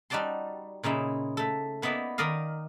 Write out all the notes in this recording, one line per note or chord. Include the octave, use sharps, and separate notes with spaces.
G3 D#4 F#4 D5 A5 C6
A#2 C#3 D#4 E4
A3 A4
A#3 B3 D#4 E4 D5
D#3 A#4 D5 D#5 F5